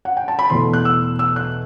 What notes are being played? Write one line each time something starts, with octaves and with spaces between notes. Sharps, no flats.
F#5
G5
A5
B5
E2 B2 A3 C6
F#6
E6
E6
F#6